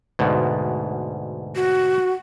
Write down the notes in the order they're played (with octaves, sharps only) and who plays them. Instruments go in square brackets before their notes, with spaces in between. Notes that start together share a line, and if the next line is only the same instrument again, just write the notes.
[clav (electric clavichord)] D2 G#2 B2
[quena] F#4